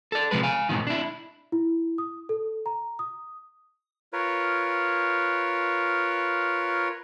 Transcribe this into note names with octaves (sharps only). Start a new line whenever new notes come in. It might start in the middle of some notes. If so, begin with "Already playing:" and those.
A4 D5
C3 F3 G#3 B4
F5 G#5
D#2 G#2 B2 D#3
D4 E4
E4
D#6
A4
A#5
D#6
F4 A#4 B4 C#5